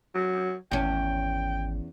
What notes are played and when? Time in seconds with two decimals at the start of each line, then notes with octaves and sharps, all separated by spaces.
0.15 F#3
0.71 G#1 E2 C#4 G5